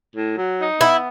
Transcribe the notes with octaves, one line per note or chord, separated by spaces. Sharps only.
A2
F#3
D#4
B3 E4